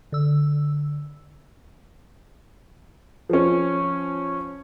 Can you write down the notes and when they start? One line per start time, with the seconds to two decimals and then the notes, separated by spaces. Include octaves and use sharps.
0.12 D3 E6
3.29 F3 C#4